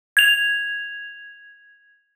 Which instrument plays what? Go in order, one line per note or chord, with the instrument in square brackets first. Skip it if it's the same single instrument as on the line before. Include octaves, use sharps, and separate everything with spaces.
[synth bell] G#6 F7